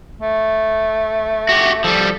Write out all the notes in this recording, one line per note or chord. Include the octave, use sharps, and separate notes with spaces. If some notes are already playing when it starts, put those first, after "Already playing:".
A3
F#4 G4
F3 G3 A4